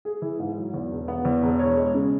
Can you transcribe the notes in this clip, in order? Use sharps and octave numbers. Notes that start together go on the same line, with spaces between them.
G#4
E3
G#2
F#3
E2
E1
B3
E2
E1
C#5
G#3
C#3